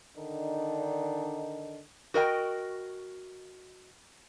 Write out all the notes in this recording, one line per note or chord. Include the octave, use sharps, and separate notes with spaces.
D3 D#3 D4 D#4
F#4 A#4 D#5 G5